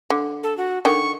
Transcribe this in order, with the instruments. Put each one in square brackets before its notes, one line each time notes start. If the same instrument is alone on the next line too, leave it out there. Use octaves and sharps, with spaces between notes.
[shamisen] D3
[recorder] A4
F#4
[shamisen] D3 D#3 G5 [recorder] C#6